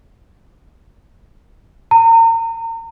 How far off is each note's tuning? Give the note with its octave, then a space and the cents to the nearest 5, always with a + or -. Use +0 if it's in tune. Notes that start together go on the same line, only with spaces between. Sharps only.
A#5 -35